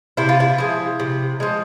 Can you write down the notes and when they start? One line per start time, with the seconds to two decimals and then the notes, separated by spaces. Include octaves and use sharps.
0.17 C3 E4
0.29 F4
0.40 E4
0.58 F3 G#3
1.00 C3
1.40 F3 G#3